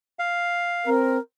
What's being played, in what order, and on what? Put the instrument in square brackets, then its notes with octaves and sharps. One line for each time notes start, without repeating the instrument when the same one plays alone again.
[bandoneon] F5
[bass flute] C4 [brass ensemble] A#4